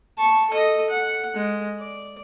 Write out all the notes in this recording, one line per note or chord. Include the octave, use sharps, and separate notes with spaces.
A5 C#6
A4 D#5
F#5
G#3
D5